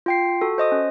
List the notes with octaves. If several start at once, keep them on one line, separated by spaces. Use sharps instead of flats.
F4 G5 C7
F#4 A4
C5 D#5 D#6
C#4